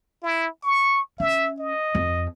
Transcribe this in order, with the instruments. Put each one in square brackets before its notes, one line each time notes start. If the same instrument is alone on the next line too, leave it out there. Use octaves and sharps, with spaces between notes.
[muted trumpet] E4
C#6
[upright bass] C#4 [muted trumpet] E5
[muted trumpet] D#5
[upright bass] F2